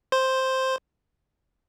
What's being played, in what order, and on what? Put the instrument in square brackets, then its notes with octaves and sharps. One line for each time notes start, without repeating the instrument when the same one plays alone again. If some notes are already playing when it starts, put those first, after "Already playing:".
[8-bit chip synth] C5